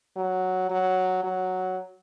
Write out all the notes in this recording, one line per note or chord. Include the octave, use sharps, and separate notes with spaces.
F#3
F#3
F#3